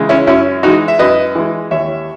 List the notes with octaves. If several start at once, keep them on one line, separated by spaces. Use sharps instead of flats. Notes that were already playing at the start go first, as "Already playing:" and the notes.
Already playing: C#3 E3 G#3
C#4 E4
F#2 C#4 E4
E3 G#3 D#4 F#4
E5
F#2 B4 D#5
E3 G#3
D#2 C#5 E5